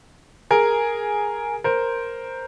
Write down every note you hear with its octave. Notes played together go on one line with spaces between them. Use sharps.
G#4 A#4
A#4 C5